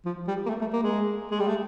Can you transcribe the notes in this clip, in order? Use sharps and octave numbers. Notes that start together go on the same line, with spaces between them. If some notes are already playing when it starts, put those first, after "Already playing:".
F3
G3
A#3
A3
A3
A#3
G#3
G#3
G3
A3